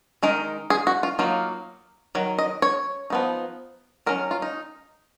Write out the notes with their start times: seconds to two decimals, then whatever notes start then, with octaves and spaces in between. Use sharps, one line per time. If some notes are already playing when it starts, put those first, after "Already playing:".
0.22 D#3 G#3 D#4 A#4
0.70 G#4
0.87 F#4
1.03 F4
1.19 F#3 A#3 D#4 F4
2.15 D#3 F#3
2.38 D#5
2.62 C#5
3.10 F3 B3 D#4
4.06 D#3 F#3 C#4 A#4
4.31 F4
4.42 D#4